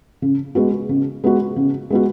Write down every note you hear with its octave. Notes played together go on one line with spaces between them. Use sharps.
C#3
G#3 B3 F#4
C#3
G#3 B3 F#4
C#3
G#3 B3 F#4